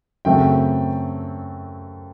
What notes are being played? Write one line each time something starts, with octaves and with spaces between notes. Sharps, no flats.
F#2 C#3 F#3 A3 C4 G5